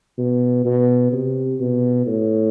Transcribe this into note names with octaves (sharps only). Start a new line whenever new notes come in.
B2
B2
C3
B2
A2